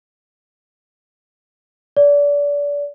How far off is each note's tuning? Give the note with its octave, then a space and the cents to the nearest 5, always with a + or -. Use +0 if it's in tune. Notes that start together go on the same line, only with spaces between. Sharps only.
D5 -30